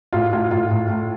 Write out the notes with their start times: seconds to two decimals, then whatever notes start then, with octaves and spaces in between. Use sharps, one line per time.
0.13 A2 F4
0.33 A2 F4
0.51 A2 F4
0.71 A2
0.90 A2